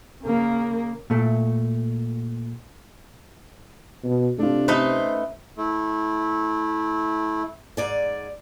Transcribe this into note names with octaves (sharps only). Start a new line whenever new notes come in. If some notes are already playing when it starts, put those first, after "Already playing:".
C#3 A#3
A#2 A3
B2
C3 A3 D4 F4
A3 C#4 D#4 B4 C5
A3 E4
G#2 D5 G#5